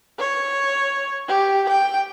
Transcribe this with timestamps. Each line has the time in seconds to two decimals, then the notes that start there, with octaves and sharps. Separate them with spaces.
0.19 C#5
1.28 G4
1.69 G5